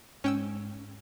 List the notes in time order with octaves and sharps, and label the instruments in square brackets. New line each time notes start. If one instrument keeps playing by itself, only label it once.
[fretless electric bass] G#2 [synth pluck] C#4 G5 E6